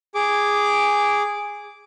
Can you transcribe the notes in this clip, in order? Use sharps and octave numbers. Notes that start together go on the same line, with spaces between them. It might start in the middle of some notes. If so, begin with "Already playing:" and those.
G#4 D6